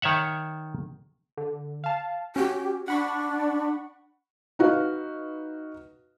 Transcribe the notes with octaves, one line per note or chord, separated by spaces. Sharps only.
D#3 C#5 E5 F#5
D3
F5 A5
C#4 F#4 G4
D4 F#5 B5 C#6
D#4 F#4 B4 F5